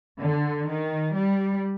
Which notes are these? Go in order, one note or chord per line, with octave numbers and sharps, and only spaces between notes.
D3
D#3
G3